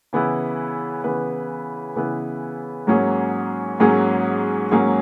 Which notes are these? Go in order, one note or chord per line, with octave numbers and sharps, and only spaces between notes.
C#3 E3 B3 E4 B4
C#3 E3 B3 E4 B4
C#3 E3 B3 E4 B4
G#2 F#3 A#3 C#4 G#4
G#2 F#3 A#3 C#4 G#4
G#2 F#3 A#3 C#4 G#4